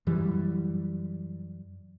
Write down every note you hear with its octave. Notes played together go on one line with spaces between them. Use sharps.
F#2 E3 G3